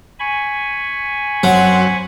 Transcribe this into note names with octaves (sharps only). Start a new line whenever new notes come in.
G#5 B5 C#6
F#2 F#3 C4 F#5